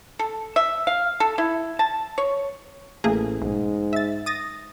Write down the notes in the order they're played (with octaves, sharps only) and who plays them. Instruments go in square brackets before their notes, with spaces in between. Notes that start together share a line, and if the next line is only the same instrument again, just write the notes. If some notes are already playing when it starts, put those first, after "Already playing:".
[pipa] A4
E5
F5
A4
E4
A5
C#5
[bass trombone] A1 [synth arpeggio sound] A3 A#3 G#4
[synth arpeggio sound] B1 [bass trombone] G#2
[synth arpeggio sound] E5 A6
D#6 A6 A#6